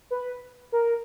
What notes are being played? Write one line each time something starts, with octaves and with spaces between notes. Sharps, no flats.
B4
A#4